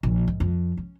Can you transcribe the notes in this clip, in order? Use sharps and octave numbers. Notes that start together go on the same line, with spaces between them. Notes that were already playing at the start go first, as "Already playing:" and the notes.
A#1
G#2
F2
C#4